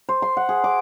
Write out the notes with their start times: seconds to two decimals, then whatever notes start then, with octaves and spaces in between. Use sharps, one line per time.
0.09 C5
0.22 C6
0.37 F#5
0.49 G#4
0.64 D6